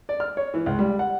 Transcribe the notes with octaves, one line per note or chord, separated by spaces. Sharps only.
D5
F6
C#5
E3
C#2
G3
F#5